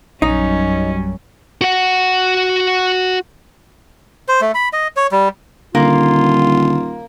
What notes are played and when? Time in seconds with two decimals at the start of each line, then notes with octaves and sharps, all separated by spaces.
0.22 A#1 F#2 F#3 G3 C#4 D#4
1.61 F#4 F#5
4.28 C5
4.41 A3
4.55 B5
4.73 D#5
4.97 C#5
5.12 G3
5.75 D#1 D3 A#3 F4